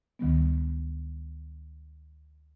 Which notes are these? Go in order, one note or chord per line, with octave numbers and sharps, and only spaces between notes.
D2 D#3 G3 B3